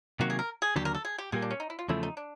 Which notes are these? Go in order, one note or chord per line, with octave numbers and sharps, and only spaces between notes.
C3 D#3 F#3 A#3 F#4
G#4
A#4
G#4
D#2 D3 F#3 G4
A#4
A4
G#4
G4
A#2 G3 A#3 G#4
D4
C#4
D#4
E4
F4
E2 C#3 F3 A3 E4
D#4
D4